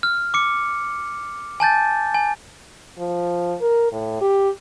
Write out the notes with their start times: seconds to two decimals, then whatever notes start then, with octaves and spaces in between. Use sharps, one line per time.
0.03 F6
0.34 D6 C#7
1.60 G#5 A5 G6 A6
2.14 G#5
2.99 F3
3.61 A#4
3.92 A2
4.21 G4